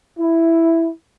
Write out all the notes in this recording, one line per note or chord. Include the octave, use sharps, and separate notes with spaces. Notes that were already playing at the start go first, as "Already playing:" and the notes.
E4